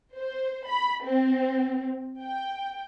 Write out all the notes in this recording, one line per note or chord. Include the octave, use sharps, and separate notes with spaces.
C5
B5
C4
G5